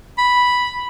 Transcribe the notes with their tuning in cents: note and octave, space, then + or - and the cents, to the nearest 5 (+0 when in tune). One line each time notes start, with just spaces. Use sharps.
B5 -5